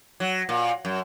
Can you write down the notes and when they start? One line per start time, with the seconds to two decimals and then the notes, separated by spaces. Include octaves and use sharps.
0.20 F#3
0.49 A#2
0.85 F#2